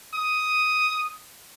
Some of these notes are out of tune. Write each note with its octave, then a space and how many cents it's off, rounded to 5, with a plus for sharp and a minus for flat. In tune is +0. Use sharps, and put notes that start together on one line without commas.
D#6 +5